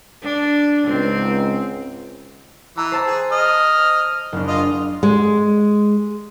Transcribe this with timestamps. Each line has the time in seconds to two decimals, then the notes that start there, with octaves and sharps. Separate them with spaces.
0.23 D4
0.87 C#2 G#2 C4
2.77 E3 A#5
2.92 C5 A5 A#5
3.06 G#4
3.32 D#5 F6
4.32 F#1 D4
4.47 F4 D#5
5.03 G#3